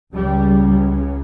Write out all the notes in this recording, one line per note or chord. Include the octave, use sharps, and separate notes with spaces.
C#2 C#3 G3